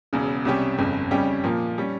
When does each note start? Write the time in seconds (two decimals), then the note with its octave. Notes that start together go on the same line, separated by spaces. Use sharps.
0.13 E1 E2 C#3
0.45 C2 C3 G3 C#4 G4
0.78 G1 F2 C#3
1.11 F2 C#3 G3 C#4 G4
1.44 A#2 F3 A#3
1.78 G3 C#4